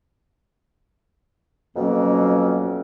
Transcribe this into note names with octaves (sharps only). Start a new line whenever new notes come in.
F2 B2 F#3 A#3 C#4